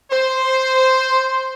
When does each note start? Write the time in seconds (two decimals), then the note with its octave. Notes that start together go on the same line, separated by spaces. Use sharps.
0.12 C5